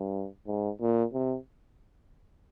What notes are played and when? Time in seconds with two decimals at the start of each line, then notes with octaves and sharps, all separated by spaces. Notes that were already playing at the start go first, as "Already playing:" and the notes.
Already playing: G2
0.47 G#2
0.81 A#2
1.13 C3